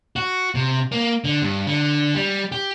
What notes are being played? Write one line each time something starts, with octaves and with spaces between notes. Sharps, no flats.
F#4
C3
A#3
D3
G2
D3
G3
G4